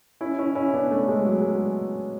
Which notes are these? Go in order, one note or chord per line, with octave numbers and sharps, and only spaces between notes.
C#4 E4
C#4 E4
C#4 E4
B3 D4
A3 C#4
G#3
F#3
G#3